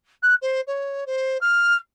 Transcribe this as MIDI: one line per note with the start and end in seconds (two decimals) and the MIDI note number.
0.22 0.35 90
0.42 0.61 72
0.67 1.04 73
1.06 1.37 72
1.41 1.77 89